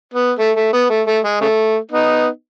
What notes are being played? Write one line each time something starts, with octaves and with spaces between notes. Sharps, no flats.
B3
A3
A3
B3
A3
A3
G#3
C#3 A3
B3 D#4